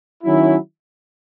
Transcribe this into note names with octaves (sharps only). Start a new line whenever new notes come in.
D#3 F#3 C#4 E4